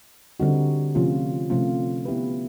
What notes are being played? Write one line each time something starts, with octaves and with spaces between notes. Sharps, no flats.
D3 G3 C4 D#4 F#4
C3 F3 A3 C#4 F4
C3 F3 A3 C#4 F4
B3 E4 G4 B4